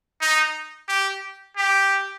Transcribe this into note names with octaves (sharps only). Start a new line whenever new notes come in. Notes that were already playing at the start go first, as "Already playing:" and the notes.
D#4
G4
G4